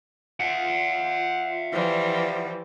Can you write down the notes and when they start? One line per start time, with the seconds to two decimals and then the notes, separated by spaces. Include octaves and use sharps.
0.40 F4 E5 F#5
1.72 E3 F3 G3